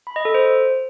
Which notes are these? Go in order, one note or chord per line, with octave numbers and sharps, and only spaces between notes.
B5
D#5
A4
C5